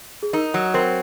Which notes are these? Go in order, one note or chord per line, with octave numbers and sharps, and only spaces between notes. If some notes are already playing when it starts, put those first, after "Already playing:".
G#4
D#4 A#4
F#3
C4 A#4